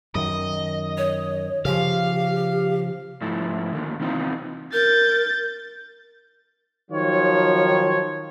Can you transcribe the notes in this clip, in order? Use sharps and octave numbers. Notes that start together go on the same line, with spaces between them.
F#2 D#3 D#5
C#5
C#3 F3 G4 F5
G#2 F3 A3 E4
D3 D#3 A#3
C3 E3 C4 D#4 F4
A#4 G6 A6
D#3 F3 F#3 F4 C#5